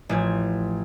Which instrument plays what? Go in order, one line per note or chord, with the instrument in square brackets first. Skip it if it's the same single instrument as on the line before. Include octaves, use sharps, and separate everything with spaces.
[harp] A1 F3 G#6